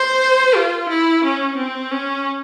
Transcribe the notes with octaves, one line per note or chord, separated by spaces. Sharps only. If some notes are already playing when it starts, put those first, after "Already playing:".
Already playing: C5
F4
E4
C#4
C4
C#4